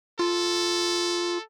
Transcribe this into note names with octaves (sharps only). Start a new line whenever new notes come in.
F4 A4